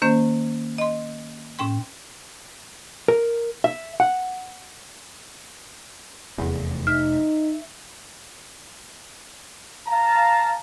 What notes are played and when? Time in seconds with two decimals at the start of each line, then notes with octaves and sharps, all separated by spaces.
0.02 D#3 A#3 C#4 C5
0.78 D#5 C6
1.59 A2 C#4 G5 C6
3.08 A#4
3.64 E5
4.00 F#5
6.38 F1 E2
6.87 D#4 E5 F6
9.87 F5 A5 A#5